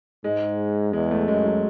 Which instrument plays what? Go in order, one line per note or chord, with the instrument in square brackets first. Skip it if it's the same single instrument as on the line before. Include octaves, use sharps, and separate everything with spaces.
[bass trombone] G#2 [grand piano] G#3
[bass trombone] E2 [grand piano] G#3
[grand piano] A3
[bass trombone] F#2 [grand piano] G#3
[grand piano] F#3